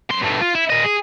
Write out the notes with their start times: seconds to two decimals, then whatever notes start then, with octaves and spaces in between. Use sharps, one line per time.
0.10 F#2 C6
0.22 G2 A3
0.41 F4
0.55 E4
0.70 A#2 D#5
0.84 G#4